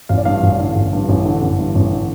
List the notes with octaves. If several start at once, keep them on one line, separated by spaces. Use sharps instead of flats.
A1 F5
D5
G2 F5
A1
D3
A1
G2
A1
D3
A1
G2
A1
D3